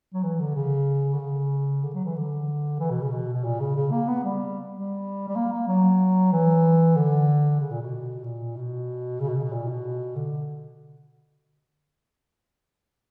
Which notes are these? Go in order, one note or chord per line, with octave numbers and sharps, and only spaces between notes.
F#3
E3
D3
C#3
D3
C#3
D3
F#3
E3
D3
E3
B2
C#3
B2
B2
A#2
C#3
C#3
A#3
B3
G3
G3
G3
A#3
A#3
F#3
E3
D3
C#3
A#2
B2
A#2
B2
C#3
B2
C#3
B2
A#2
B2
D3